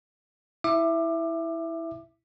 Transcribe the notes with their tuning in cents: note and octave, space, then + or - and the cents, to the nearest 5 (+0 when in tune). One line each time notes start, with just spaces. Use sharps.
E4 -10 E5 +10 D6 +20